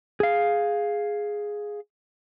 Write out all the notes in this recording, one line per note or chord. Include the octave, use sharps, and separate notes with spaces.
G#4 F5